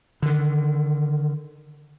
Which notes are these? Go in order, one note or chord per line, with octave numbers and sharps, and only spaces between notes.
D3 D#3